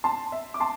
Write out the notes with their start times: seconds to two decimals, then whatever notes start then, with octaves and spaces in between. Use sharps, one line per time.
0.04 A5 C6
0.32 E5
0.54 D6
0.60 A5 C6